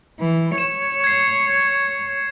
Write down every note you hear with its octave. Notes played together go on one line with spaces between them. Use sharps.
E3
C#5 E7
G#6 C7